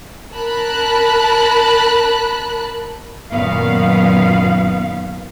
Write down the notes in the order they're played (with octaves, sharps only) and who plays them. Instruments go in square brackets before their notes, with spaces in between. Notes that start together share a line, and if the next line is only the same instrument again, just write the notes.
[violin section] A#4 A5 B5 F#6
[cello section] F#2 A#2 D#3 F#3 B3 F5